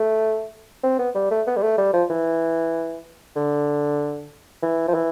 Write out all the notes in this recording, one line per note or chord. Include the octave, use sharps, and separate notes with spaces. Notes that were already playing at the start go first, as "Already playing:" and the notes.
Already playing: A3
C4
B3
G3
A3
B3
G3
A3
G3
F3
E3
D3
E3
F3
E3